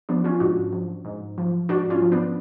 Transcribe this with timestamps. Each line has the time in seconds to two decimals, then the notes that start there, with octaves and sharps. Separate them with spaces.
0.09 F3 B3 D4
0.24 C#4 F4
0.40 G#2 D4 F#4
0.73 F3
1.05 G#2
1.38 F3
1.69 G#2 D4 F#4
1.90 C#4 F4
2.02 F3
2.12 B3 D4